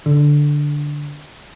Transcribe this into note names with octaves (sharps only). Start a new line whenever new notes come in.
D3